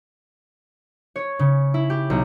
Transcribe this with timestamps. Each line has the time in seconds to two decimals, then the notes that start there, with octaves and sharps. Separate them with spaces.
1.16 C#5
1.39 C#3
1.74 E4
1.90 G4
2.10 B1